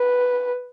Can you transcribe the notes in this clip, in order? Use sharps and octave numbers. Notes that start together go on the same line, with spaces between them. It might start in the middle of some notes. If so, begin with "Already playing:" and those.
Already playing: B4